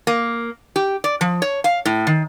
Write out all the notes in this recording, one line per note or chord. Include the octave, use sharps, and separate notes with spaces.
A#3
G4
D5
F3
C#5
F5
A2
D#3